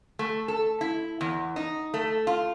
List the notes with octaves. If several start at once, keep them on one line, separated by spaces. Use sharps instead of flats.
A3
A4
E4
E2
D#4
A3
F4